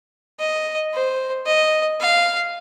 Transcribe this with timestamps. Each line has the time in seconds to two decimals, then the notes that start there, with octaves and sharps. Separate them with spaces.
0.39 D#5
0.94 C5
1.46 D#5
2.00 F5